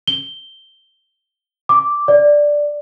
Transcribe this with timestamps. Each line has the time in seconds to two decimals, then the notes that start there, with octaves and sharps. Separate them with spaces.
0.08 G7
1.69 D6
2.08 D5